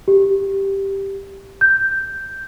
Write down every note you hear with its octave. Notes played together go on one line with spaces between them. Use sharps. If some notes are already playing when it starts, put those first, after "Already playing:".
G4
G6